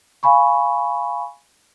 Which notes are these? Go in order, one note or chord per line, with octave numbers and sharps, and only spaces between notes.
F5 G#5 B5 C#6